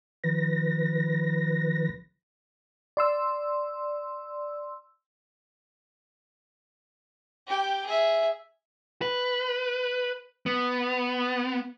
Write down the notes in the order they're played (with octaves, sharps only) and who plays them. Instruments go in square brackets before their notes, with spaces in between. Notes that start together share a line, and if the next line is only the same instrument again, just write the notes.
[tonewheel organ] D#3 F3 B4 A#6
[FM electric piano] D5 C6 E6
[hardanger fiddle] G4 G5
G#4 E5
[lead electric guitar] B4
B3